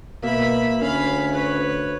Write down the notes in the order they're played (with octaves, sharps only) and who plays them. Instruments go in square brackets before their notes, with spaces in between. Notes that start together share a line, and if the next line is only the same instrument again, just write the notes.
[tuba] B2 [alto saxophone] A#3 [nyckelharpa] E5 B5
[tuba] D2 [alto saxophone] C#4 [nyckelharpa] F5 B5
[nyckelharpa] B4 C#5